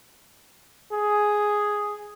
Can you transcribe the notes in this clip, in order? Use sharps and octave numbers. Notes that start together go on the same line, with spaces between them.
G#4